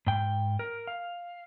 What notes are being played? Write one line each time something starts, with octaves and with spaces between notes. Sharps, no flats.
G#2 G5
A#4
F5